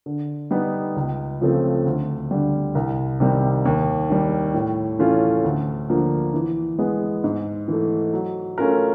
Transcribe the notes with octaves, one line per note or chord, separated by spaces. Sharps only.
D3
G3 B3 D#4
C#2
C#3 F3 A3 C4
D2
D3 G3
C2
C3 D#3 G3
D#2
D#3 G3
A2
E3 A3 C#4 F4
D2
D3 F3 A#3
E3
G#3 B3
G#2
E3 A3
F#3
A3 C#4 F4 A#4